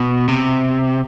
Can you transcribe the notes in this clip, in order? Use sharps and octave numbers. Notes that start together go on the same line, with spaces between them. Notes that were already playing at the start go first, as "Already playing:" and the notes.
Already playing: B2
C3